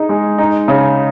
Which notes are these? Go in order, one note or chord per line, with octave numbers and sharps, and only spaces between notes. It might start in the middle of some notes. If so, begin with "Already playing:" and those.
Already playing: D#4 G#4
G#3
D#4
C#3